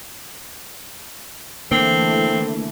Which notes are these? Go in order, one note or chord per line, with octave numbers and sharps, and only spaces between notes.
D3 E3 A3 A#3 C4